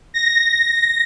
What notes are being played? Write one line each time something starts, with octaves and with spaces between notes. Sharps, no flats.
A#6